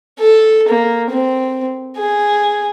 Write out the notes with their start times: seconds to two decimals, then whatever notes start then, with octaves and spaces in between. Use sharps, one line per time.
0.19 A4
0.69 A#3
1.10 C4
1.97 G#4